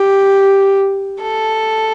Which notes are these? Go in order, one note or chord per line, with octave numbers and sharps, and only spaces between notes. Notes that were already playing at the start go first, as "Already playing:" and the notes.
Already playing: G4
A4